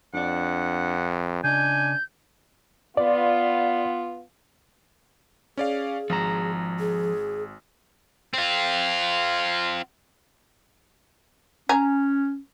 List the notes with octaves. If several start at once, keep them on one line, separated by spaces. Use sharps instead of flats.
F2 D4 D5 F#5
C#3 D4 D#5 G#5 G6
B3 F4 D5
C#4 G#4 D5 F5
G#1 F3 A#5
G#4
C4 F4
C#4 G#5 A#5